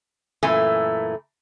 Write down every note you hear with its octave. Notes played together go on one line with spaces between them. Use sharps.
F#2 A#2 E3 A3 G#5